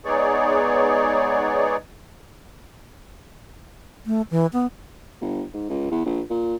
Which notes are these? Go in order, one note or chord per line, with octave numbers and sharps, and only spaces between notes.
G#3 B3 D#4 G#4 C#5 D5
A3
E3
B3
G1
G#2
C#2
E2
A#1
A#2